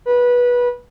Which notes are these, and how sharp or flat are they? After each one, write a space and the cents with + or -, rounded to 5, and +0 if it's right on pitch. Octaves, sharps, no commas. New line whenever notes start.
B4 -20